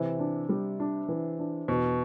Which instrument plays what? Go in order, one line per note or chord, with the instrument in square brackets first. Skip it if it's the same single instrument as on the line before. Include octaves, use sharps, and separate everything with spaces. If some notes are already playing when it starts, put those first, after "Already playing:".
Already playing: [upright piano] C3 [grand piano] E3
[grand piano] D4
G3
D4
E3
D4
[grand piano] E2 [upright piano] B2